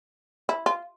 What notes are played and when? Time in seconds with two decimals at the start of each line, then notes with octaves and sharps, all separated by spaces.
0.49 E4
0.66 F4